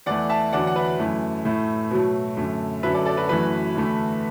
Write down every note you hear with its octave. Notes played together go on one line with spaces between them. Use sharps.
E2 E3 A3 D5 F#5
E5 A5
E2 D3 F#3 D5 F#5
F#5
B4 E5
F#2 E3 A3
A2 A3
B2 F#3 A3
F#2 D3 A3
F#2 D3 F#3 B4 E5
A4 D5
A4 D5
F#4 B4
F#2 E3 A3 F#4 B4
E2 D3 A3